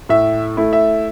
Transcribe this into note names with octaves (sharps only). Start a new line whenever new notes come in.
A2 E5
A3 E4
E5